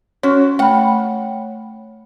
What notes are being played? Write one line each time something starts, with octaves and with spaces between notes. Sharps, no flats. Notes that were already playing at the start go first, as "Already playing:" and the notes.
C#4 F#4 C#5 C6
A3 F#5 G5 B5